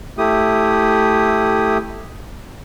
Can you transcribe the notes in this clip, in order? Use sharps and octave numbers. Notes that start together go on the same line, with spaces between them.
A3 E4 G4 D#6